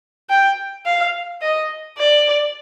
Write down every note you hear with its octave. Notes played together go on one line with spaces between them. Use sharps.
G5
F5
D#5
D5